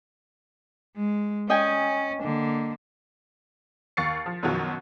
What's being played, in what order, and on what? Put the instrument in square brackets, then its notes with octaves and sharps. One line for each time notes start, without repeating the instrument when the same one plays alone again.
[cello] G#3
[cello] C#4 [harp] D#5 G5 G#5
[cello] D3 A#3
[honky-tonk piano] D#2 C#6 A6 C7 C#7
F3
F#2 B2 D#3 F3 F#3